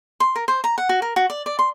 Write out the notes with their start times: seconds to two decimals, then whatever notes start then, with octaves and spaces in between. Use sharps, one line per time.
0.20 C6
0.36 A#4
0.48 C5
0.64 A#5
0.78 F#5
0.89 F#4
1.02 A#4
1.16 F#4
1.30 D5
1.46 D5
1.59 C6